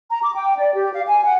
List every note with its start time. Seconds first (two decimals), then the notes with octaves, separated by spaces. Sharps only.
0.10 A#5
0.23 D6
0.35 G5
0.57 D5
0.74 G4
0.93 F5
1.07 G#5
1.25 F#5